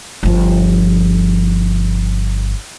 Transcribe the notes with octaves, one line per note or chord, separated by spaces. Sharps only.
G1 F3